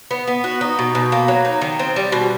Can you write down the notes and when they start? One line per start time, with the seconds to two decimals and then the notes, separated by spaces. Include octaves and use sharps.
0.11 B3
0.28 B3
0.44 F#4
0.61 D#4
0.79 B2
0.95 B2
1.12 A#3
1.28 F#3
1.45 D#4
1.61 D#3
1.79 C4
1.96 G3
2.12 B2